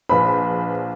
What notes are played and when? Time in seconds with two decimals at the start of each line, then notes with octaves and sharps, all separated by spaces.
0.09 A#1 B4 C5 B5